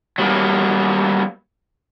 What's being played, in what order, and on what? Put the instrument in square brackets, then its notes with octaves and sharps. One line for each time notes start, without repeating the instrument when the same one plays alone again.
[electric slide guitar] F#3 G3 A#3 B3